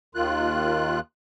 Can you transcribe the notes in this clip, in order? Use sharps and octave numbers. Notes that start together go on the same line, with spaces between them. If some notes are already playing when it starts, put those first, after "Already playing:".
D#2 D#3 F4 F#6